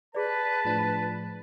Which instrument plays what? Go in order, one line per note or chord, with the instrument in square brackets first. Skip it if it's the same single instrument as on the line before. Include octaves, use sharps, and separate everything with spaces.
[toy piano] G#4 D5 [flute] B4 [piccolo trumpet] A5
[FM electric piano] A2 F3 D4